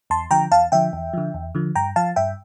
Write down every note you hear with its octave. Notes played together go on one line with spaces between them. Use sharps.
E2 A5 C6
D3 F3 G5 A#5
E2 F5 A5
D3 F3 E5 G5
E2
D3 F3
E2
D3 F3
G2 G5 A#5
F3 F5 A5
G2 E5 G5